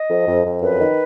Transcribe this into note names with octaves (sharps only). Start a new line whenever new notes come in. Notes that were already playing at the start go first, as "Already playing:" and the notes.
Already playing: D#5
F2
F2
F2
F#2 B4
D#3